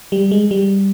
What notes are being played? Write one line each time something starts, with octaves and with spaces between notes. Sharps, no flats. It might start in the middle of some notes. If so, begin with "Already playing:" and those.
G3
G#3
G3